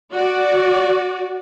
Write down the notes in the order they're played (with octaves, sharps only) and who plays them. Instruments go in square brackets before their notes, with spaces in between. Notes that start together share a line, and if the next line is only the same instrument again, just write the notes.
[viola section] F#4 D5